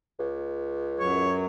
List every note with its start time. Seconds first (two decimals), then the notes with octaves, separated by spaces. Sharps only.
0.19 C#2
1.00 F#2 F#3 C#5